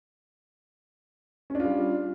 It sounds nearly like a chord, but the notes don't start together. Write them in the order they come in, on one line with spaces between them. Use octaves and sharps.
C#4 D4 F4 G3